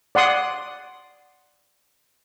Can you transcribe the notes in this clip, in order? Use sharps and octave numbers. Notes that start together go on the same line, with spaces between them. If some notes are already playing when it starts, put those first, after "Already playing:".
D5 F#5 C6 D#6